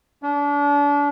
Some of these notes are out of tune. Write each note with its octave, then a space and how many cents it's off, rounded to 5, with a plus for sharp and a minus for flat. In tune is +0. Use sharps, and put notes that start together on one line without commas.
D4 -35